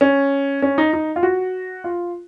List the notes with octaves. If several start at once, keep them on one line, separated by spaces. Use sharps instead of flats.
C#4
C#4
D#4
D#4
F4
F#4
F4